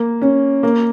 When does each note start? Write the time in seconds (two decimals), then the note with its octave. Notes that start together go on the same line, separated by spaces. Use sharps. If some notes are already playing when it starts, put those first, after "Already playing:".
Already playing: A#3
0.22 C#4
0.63 A#3